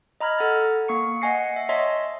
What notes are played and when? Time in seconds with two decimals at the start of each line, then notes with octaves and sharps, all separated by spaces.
0.20 D#5 A#5 B5 F6 G#6
0.38 A4 F#5 F6 A6
0.88 A#3 C#6 C#7
1.21 D#5 F#5 G#5 A#6 C7 C#7
1.56 E5
1.69 C#5 D#5 E5 A5 C6 B6